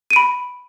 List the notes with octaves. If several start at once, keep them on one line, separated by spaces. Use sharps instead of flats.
B5 D7 D#7